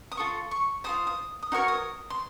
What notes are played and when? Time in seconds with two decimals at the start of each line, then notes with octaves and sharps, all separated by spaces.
0.12 D#6
0.17 F4 A4 C#6
0.51 C#6
0.84 F4 A4 C5 D#6
1.07 D#6
1.42 D#6
1.52 D#4 F#4 A#4 C#5 C#6
1.68 D#6
2.10 C6